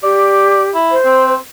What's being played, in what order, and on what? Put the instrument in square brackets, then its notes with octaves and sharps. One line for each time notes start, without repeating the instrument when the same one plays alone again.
[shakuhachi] G4 [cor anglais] D5
[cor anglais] E4
[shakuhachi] C5
[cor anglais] C4